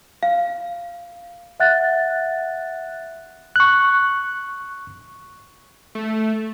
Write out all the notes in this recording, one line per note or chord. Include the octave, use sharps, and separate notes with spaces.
F5
E5 F#5 F#6 A6
C#6 F#6
A3